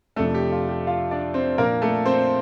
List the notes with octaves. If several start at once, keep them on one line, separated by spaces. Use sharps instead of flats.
F2 C3 F3 A3 D4 A4
G4
F4
G4
F4 F5
D4 D5
C4 C5
A#2 F3 A#3 D4 A#4
A3 A4
C4 C5